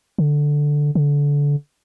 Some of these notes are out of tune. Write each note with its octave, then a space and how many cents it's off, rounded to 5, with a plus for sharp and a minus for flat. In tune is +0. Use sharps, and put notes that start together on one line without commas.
D3 +0
D3 -25